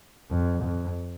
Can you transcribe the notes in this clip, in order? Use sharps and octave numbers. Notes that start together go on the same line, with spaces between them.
F2
F2